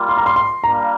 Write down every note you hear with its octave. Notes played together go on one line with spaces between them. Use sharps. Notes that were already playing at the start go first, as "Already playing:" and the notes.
Already playing: G3 A#3 F4
C6
A#5
C6
C6
G3 A#3 D4 F4 A#4 A#5